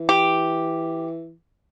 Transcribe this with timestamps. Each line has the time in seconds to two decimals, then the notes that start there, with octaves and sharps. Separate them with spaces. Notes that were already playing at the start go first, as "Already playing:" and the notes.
Already playing: E3
0.09 G4